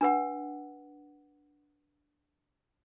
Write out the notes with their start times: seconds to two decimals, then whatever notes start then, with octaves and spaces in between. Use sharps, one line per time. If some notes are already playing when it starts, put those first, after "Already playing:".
0.01 D4 B4 F#5